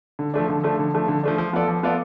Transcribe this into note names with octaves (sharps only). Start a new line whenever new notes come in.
D3
F3 A3 D4
D3
F3 A3 D4
D3
F3 A3 D4
D3
F3 A3 D4
F3
B3 F4 A4 D5
F3
B3 F4 A4 D5